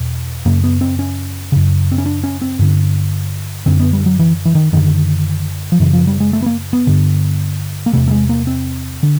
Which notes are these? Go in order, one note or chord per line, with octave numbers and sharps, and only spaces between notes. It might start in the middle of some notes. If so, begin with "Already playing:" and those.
Already playing: E2 B2
F#2 C#3 A#3
B3
C4
C#4
F#2 C#3
C4
C#4
D4
C#4
C4
G2 D3
F#2 D3 C4
B3
G3
F#3
E3
E3
D#3
F#2 D3 D#3
F3
F#2 C#3 E3
F3
G3
G#3
A3
B3
A#3
B3
G2 D3
A#3
E2 C3 A3
A3
G#3
A#3
C4
D3